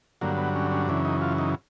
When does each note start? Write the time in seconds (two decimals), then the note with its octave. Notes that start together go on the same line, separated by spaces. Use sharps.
0.21 G2 D3 F#3 A#3
0.38 B3
0.55 C#4
0.71 C#4
0.88 F#2 C#3 E3 D4
1.05 D#4
1.22 F4
1.38 D#4